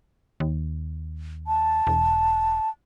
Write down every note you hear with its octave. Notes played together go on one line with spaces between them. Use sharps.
D#2
A5
E1